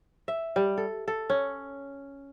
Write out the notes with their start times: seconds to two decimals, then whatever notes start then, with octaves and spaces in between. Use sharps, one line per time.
0.28 E5
0.56 G3
0.78 A4
1.08 A4
1.30 C#4